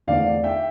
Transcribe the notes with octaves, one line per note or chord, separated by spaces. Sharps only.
E2 D3 A3 C4 D5 F5
E5 G5